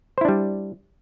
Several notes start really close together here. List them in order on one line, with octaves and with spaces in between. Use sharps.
C5 E4 D4 G3